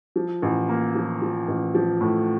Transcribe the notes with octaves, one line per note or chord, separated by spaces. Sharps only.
F3
A1
A#3
F3
F3
A1
F3
A2